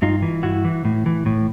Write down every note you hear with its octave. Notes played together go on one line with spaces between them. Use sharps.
G2 D#4 F4
E3
G2 E4 F#4
E3
A2
E3
A2